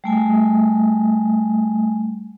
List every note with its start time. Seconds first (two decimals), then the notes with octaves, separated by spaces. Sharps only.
0.04 G3 A3 G#5